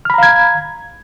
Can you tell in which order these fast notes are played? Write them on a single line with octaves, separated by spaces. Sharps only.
F6 B5 A#5 F5 G#6